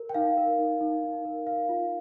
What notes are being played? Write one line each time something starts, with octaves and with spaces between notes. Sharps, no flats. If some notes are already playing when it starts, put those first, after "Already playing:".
Already playing: A#4
G5
D#4 F5
A#4
D#4
D#4
D#4
A#4
A#4 F5
F4